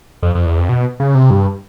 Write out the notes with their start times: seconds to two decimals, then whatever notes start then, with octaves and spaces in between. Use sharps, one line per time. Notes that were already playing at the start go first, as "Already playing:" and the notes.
0.23 F2
0.35 F2
0.46 E2
0.58 F2
0.69 B2
1.00 C#3
1.15 C3
1.30 G2